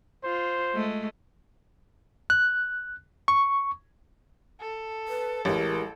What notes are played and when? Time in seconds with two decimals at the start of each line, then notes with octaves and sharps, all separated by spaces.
0.24 F4 C5
0.73 G#3 A3
2.30 F#6
3.28 C#6
4.60 A4
5.08 B4
5.45 A1 G#3 E4 G4 A#4